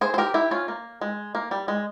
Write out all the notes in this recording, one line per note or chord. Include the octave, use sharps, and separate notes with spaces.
G#4 C5
C5
G4 A#4
E4 G4
C#4 F4
A#3
G#3
A#3
G3
G#3